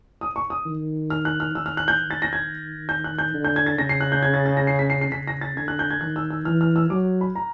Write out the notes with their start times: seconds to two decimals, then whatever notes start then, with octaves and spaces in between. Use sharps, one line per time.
0.21 D#6
0.36 C#6
0.50 D#6
0.66 D#3
1.10 F6
1.25 F#6
1.40 F6
1.55 D#3 E6
1.66 F6
1.77 F#6
1.88 G6
2.00 D#3
2.11 A6
2.22 A#6
2.33 G#6
2.89 G6
3.04 F#6
3.19 G6
3.34 D3
3.45 G6
3.56 G#6
3.66 A6
3.78 C#3 A#6
3.89 C7
4.01 F#6
4.12 G6
4.23 G#6
4.34 A6
4.46 A6
4.57 A#6
4.67 C7
4.79 B6
4.90 C7
5.01 C7
5.12 C#3 B6
5.28 A#6
5.41 A6
5.57 D3 G#6
5.68 F#6
5.79 G6
5.91 G#6
6.01 D#3 F#6
6.16 E6
6.31 E6
6.45 E3 F6
6.61 F6
6.76 E6
6.90 F#3 D6
7.21 B5
7.36 A#5